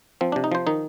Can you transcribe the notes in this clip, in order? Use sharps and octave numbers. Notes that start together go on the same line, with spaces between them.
F3 C4
C3 D4
D#4
F3 C5
D#3 D#4